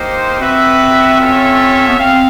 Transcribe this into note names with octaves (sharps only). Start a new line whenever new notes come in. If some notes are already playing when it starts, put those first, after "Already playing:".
Already playing: A#3 D#4 G4 C5
C4 F#4 B4 E5
C#4 F4 A4 C#5 E5
B3
C4 F5